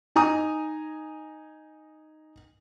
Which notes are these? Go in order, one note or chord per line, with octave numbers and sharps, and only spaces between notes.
D#4 G#5 A#5 D#6